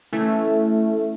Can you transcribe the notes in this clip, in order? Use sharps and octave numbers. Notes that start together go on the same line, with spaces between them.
E3 A3 C#4 E4